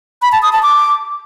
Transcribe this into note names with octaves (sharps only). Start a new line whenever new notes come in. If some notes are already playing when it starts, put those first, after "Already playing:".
B5
A5
D#6
A5
D6